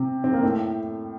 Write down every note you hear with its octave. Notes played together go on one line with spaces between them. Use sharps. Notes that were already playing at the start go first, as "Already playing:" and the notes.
Already playing: C3 C4
C4
A#3
A2 A3